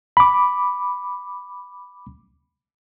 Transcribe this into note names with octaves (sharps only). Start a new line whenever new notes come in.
B5 D6